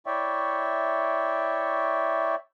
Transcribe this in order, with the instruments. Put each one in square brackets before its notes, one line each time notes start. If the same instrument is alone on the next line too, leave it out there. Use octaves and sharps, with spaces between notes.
[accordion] E4 C#5 D5 E5 G5 C#6